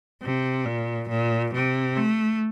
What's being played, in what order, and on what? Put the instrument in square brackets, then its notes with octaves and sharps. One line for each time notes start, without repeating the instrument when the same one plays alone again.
[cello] C3
A#2
A#2
C3
A3